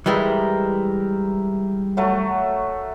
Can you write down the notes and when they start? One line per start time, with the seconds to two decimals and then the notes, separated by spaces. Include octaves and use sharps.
0.06 E3 G3 G#3 A#4 E5 A#5
1.97 F#3 A3 C#6